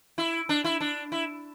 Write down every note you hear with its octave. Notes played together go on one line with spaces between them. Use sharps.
E4
D4
E4
D4
E4